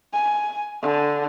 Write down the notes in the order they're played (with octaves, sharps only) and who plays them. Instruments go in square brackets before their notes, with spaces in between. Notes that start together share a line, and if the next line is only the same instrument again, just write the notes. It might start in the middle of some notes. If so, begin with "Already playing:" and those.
[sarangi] G#5
D3